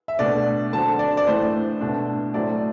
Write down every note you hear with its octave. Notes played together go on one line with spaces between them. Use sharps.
E5
B2 A3 D4 D5
D3 F#3 C4 A5
D5
D5
A2 E3 A3 D4 C5
B2 A3 D4
A2 F#3 A3 C4 D5